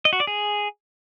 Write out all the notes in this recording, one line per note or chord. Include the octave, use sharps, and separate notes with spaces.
D#5
F#4
D5
G#4